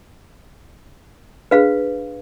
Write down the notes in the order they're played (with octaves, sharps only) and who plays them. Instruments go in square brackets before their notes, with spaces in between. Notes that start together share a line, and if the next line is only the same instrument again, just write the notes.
[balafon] D4 G#4 [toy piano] B4 F5